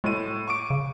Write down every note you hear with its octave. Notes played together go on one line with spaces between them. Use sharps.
A2 G#3 D#7
C#6 D6 D7
C#3